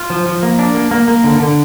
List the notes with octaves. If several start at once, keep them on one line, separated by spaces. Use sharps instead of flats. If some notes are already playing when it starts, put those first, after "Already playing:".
Already playing: F4
F3
F3
A#3
D4
A#3
A#3
A#3
D3
D3